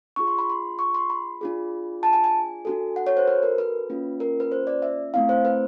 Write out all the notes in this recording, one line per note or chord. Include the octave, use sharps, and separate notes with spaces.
D4 F4 G#4 C#6
C6
B5
C6
C#6
C6
B5
D4 F4 G#4
A5
G#5
G#5
D4 F#4 A4
F#5
C#5
C5
B4
A#4
B4
A#3 C#4 F4
A#4
B4
C5
D5
E5
A3 C4 E4 F5
C5
B4